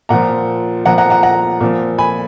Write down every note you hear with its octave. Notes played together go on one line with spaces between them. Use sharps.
A#2 F3 F#5 A#5
A#2 F3 F#5 A#5
F#5 A#5
F#5 A#5
F#5 A#5
A#2 F3
G#5 B5